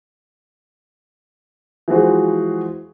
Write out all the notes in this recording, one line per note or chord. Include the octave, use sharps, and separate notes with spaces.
E3 F3 G#3 F#4 G#4 C5